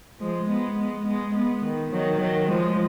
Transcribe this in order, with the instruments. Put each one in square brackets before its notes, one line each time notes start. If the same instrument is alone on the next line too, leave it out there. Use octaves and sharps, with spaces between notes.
[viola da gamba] F3 G#3
G#3 B3
G#3 B3
G#3 B3
G#3 B3
D#3
D#3 F#3
D#3 F#3
F3 G#3